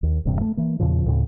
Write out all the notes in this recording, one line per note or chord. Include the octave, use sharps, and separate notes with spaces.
D#2
E1 E2 G2 C3
A3
E3 A#3
E2 A#2 C#3 F3
D2 A2 C#3